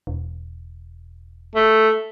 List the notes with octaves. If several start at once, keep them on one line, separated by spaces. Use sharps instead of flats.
E1
A3